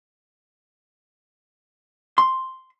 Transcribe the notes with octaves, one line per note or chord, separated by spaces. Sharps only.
C6